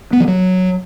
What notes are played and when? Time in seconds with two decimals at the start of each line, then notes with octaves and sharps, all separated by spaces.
0.13 B3
0.20 F3
0.28 F#3